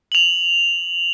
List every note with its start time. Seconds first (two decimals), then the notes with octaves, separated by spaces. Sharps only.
0.12 F7 F#7